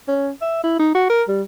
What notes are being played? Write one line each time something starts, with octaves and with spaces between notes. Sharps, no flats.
C#4
E5
E4
D#4
F#4
A#4
G3